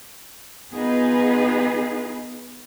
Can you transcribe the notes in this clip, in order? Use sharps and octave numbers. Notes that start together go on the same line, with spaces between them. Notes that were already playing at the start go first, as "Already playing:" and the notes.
B3 D#4 F4 G#4 B4